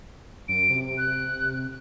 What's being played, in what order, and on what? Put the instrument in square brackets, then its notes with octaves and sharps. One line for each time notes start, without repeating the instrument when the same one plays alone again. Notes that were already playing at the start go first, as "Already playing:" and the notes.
[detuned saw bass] F#2 [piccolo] D7
[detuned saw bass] C3
[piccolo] F#6